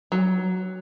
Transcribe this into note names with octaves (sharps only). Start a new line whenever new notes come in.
F#3